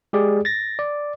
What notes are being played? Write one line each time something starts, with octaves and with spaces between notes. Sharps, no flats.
G#3 G4 G#4 D5
A6 A#6
D5